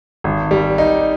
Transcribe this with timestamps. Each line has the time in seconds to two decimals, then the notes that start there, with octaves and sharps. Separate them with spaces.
0.24 G#1
0.51 G3
0.78 D#4